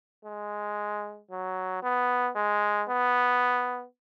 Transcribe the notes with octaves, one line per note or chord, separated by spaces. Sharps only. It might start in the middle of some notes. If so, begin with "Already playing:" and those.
G#3
F#3
B3
G#3
B3